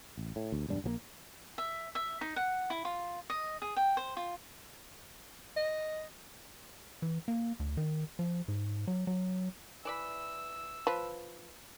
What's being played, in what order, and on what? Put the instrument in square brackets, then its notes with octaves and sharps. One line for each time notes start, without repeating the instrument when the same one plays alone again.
[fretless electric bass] A1
A2
D2
E1 G2 D4
A#1 F3 A#3
[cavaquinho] E5
E5
D#4
F#5
E4
F4
D#5
G#4
G5
C5
F4
[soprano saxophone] D#5
[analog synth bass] E3
A#3
D2
D#3
F3
G#2
F#3
F#3
[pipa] E3 D5 B5 [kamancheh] E6
[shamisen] F3 [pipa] B4